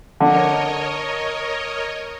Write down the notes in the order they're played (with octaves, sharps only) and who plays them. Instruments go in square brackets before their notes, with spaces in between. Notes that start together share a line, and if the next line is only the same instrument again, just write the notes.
[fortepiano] D3 [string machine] A#4 C#5 D#5